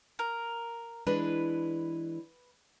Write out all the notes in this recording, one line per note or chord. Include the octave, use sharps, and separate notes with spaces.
A#4
E3 G#3 D4 B4